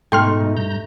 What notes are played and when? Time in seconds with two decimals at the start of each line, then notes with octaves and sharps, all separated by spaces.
0.12 G#2 B2 A3 D#4 G5 C6 F6
0.57 G2 A#5 G6